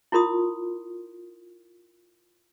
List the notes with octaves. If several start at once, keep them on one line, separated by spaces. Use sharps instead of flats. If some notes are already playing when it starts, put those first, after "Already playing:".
E4 F4 A#4 C6 D#6